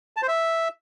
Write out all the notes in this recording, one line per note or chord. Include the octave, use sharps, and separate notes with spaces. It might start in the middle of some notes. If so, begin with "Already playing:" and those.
A5
C5
E5